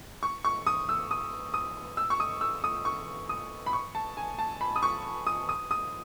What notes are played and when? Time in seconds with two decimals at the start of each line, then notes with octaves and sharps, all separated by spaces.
0.23 C#6
0.45 C#6
0.67 D#6
0.89 E6
1.11 D#6
1.54 D#6
1.97 E6
2.10 C#6
2.20 D#6
2.41 E6
2.64 D#6
2.85 C#6
3.29 D#6
3.66 B5
3.73 C#6
3.95 A5
4.17 G#5
4.39 A5
4.61 B5
4.76 D#6
4.83 C#6
5.27 D#6
5.49 D#6
5.71 D#6